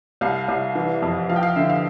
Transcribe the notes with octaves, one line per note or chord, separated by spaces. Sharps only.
C2 F5
C2
E3
F2
F3 F5
G5
F5
D3 E5
F5